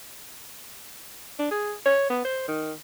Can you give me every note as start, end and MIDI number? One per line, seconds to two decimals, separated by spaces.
1.39 1.47 62
1.51 1.74 68
1.86 2.08 73
2.10 2.22 59
2.25 2.48 72
2.48 2.72 51